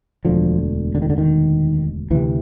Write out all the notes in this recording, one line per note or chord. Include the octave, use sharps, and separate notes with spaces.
E1 D2 D3 F3
D3
D#3
D3
D#3
D2 C3 E3